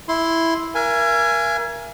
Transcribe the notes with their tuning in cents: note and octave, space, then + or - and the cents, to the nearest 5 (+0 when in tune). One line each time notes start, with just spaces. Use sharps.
E4 +0 C6 +0
A#4 +25 E5 +45 G#5 +0